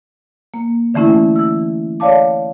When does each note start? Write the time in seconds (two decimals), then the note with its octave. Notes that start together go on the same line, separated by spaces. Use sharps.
0.54 A#3
0.94 D3 E3 A3 C#4 E4
1.36 E3 E6
2.00 C#5 D5 F5 A5 D6